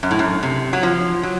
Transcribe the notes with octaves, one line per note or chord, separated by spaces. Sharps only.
F#2
A2
F#2
C3
F#3
F3
F#3